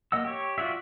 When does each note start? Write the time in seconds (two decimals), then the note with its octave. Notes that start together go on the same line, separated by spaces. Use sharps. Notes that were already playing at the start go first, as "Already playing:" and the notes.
0.12 A#3 D#5 F#5 E6
0.24 G4 C#5
0.58 F4 F#4 D5 E5